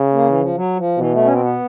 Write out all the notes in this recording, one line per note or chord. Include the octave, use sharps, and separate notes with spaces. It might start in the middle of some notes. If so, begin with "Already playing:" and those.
Already playing: C#3
A#3
E3
F3
F#3
F3
B2 E3
A3
C#4
C4
B3